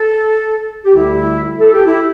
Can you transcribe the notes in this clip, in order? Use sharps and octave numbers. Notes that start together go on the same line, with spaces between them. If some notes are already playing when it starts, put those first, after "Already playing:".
Already playing: A4
G4
D2 D3 G3 E4
A4
G4
E4